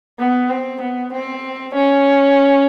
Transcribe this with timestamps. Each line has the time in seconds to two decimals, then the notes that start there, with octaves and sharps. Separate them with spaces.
0.19 B3
0.49 C4
0.81 B3
1.13 C4
1.74 C#4